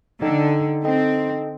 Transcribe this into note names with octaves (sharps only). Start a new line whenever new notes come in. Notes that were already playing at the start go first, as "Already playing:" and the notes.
D3 D#4 A4 D#5 G5
C4 D#4 A4 D#5 G5